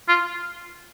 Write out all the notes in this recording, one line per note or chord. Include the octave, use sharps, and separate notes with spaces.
F4